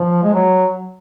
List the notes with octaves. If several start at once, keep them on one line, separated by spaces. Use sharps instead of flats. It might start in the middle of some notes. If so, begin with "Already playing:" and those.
Already playing: F3
G#3
F#3